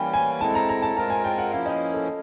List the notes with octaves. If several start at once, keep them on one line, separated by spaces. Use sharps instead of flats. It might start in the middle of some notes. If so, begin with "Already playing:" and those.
Already playing: E3 G3 A#3 C#4 G5 B5
G#5
G#3 C4 E4 A4 A5
A#5
A#5
A5
G#3 C4 F4 A#4 A#5
G#5
G5
F#5
F3 A#3 C#4 E4 F5
D#5
A4